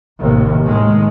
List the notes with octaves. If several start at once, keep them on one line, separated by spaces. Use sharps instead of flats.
A1 D#2 C3
A2 D#3 G#3